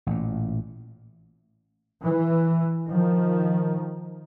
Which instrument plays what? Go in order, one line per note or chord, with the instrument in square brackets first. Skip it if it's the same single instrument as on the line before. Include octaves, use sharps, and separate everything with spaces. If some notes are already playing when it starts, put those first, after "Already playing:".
[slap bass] A1 A#2
[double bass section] E3
D#3 F3